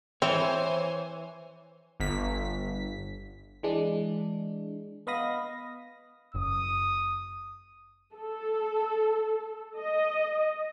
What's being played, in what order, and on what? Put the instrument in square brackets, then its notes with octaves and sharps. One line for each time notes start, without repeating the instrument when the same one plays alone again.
[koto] E3 [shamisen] C4 [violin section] C5 G#5 [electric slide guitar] C#5
[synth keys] G1 B6
[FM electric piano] E3 G#3 D4
B3 D#5 F5 B5 D#6 A#6
[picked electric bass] F#1 [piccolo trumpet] D#6
[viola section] A4
D#5